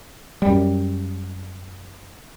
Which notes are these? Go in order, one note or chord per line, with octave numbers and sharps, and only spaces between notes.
F#2 G3